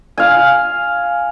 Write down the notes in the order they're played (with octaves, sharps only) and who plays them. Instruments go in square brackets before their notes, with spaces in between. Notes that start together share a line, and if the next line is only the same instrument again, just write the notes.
[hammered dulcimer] F5 G#5